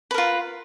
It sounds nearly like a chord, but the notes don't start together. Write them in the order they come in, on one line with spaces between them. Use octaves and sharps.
B4 A#4 F4